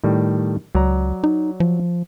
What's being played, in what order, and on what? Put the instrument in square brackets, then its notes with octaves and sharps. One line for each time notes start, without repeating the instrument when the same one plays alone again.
[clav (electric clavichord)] A2 D#3 G3
[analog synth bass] C#2 [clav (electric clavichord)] F#3 D5 A#5
[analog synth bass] D#4
F3